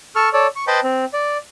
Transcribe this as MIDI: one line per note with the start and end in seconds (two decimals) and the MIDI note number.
0.16 0.29 69
0.16 0.29 85
0.16 0.29 89
0.33 0.47 69
0.33 0.47 73
0.33 0.47 74
0.56 0.65 85
0.67 0.80 71
0.67 0.80 72
0.67 0.80 75
0.67 0.80 79
0.67 0.80 81
0.67 0.80 83
0.83 1.05 60
1.13 1.37 74